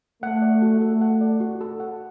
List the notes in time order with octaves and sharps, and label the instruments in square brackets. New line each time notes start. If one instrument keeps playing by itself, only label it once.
[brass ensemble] A3 [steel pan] F#5
[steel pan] D5
F#4
[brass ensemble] A3 [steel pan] A4
[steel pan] F#5
D5
F#4
A4
F#5